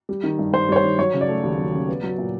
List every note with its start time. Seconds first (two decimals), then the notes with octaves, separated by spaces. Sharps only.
0.09 G3
0.24 D#3
0.39 G2
0.53 G2 C5
0.69 G3 C#5
0.76 C5
0.84 D#3
0.98 F#3 C#5
1.14 C#3
1.21 D5
1.28 A3
1.43 D#2
1.58 F#3
1.73 C#3
1.89 B3
2.03 F#3
2.18 A#2